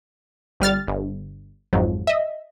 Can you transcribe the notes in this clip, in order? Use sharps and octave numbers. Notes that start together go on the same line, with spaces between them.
G1 G3 F6 A6
G1
G#1 F2 G#2 F#3
D#5 E5